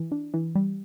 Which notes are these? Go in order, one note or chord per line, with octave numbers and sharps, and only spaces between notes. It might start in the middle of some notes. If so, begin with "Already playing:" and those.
Already playing: E3
D4
E3
G3